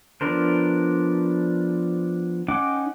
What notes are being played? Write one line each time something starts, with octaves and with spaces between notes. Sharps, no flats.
F3 B3 D4 A#4 C5
C#4 D#4 F#5 G5 D6